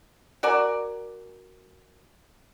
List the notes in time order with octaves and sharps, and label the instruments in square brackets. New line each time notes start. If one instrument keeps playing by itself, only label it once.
[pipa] F#4 A#4 D5 G#5